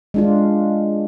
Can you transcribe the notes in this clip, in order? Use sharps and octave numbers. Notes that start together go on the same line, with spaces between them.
G#3 D4 F4